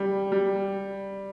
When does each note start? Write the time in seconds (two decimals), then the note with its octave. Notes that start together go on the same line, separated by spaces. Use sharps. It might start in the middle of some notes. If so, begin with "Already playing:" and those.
Already playing: G3
0.32 G3